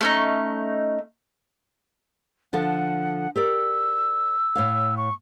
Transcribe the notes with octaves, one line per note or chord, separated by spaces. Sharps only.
A3 C#4 D#4
D3 F3 A4 F#5
G4 A#4 D5 E6
A2 C#5 F5
C#6